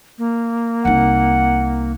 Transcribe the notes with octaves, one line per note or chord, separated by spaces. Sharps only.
A#3
C2 D#4 F#5